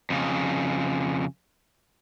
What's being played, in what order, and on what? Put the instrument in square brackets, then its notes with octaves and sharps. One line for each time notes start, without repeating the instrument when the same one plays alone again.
[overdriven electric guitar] F2 C#3